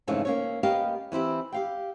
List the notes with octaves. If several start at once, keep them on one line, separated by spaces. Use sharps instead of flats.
F2 G#2 C#3 E3 A3 C#4
A#3 C#4 C#5
A#3 B3 C#4 G4 D#5 F5
E3 C4 E4 G4
G4 F5 G5